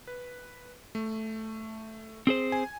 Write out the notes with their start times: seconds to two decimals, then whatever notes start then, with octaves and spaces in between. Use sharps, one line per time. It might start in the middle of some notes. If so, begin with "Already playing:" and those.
0.07 B4
0.95 A3
2.27 C4 G#4 C5
2.52 G#5